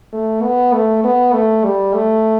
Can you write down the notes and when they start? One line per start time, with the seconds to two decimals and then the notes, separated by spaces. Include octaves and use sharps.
0.13 A3
0.43 B3
0.74 A3
1.04 B3
1.34 A3
1.64 G3
1.94 A3